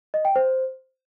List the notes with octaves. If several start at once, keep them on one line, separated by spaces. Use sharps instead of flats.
D#5
G5
C5